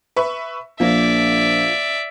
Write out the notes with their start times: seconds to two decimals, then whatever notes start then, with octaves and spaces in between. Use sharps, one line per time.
0.16 B4 E5 C#6
0.80 A#1 F3 A#3 D5 E5